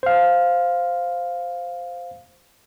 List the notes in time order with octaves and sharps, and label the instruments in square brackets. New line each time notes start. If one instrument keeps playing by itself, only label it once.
[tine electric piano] C5 F5